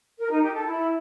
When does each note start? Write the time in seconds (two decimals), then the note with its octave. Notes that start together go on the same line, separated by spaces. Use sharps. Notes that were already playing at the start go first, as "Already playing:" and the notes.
0.18 A#4
0.30 D#4
0.42 G4
0.53 A4
0.65 E4